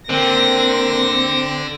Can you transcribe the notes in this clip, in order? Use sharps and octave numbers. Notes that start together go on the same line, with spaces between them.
D3 A#3 C4 A#6